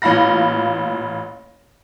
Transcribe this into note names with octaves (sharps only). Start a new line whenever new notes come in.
A1 A#2 F5 B5 A#6